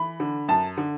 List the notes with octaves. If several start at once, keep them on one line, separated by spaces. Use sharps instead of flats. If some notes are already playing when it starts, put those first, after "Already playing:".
Already playing: E3 B5
D3
F#2 A5
D3